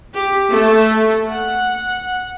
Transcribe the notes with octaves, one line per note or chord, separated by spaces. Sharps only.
G4
A3
F#5